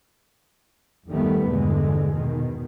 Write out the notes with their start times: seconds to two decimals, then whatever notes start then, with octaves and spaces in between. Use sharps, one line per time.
1.08 E2 G2 D#3 G3 A3 B3
1.49 E2 G2 B2 D3 G#3
2.13 B2 D#3